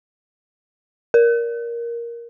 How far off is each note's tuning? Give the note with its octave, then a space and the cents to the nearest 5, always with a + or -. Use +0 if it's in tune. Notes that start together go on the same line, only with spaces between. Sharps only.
A#4 +10